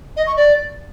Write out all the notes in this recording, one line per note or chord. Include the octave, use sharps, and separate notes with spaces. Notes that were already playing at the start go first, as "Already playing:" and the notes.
D#5
C#6
D5